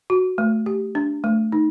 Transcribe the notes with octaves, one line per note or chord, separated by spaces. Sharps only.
F#4
A3
G4
D4
A3
D#4